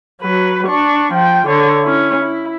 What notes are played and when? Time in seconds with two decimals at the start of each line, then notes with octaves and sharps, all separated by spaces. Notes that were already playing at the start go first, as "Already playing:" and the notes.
0.22 F#3 B4
0.67 D4 C#6
1.13 F3 G5
1.47 D3 C#5
1.84 C#4 E4
2.21 E4